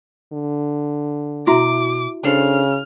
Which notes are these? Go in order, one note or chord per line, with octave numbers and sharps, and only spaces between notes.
D3
B2 E4 F#4 E5 A#5 D6
C#3 D4 A4 C5 F6